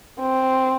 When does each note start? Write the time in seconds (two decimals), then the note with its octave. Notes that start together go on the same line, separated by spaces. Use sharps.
0.20 C4